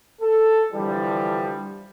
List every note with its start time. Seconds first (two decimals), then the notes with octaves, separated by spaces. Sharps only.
0.22 A4
0.73 D3 E3 F3 G3